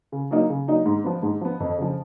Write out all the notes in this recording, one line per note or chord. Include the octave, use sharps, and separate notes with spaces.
C#3
F#3 A#3 D#4
C#3
F#3 A#3 D#4
G#2
F3 B3
G#2
F3 B3
F2
C#3 F3